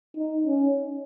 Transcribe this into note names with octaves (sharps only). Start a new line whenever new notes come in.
D#4
C#4